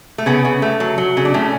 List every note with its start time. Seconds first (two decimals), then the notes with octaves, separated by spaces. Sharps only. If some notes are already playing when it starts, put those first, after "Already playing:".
0.18 A3
0.26 C#3 B3
0.45 C#3
0.62 A3
0.80 F#3
0.98 F#3
1.17 C#3
1.25 D4
1.34 A2 A3 C#4